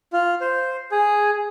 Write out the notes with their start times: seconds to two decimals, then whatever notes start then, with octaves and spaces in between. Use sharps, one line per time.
0.13 F4
0.41 C5
0.91 G#4